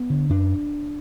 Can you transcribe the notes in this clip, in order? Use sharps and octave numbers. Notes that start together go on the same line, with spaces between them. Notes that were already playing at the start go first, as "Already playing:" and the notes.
Already playing: B3
D3
F#2 D4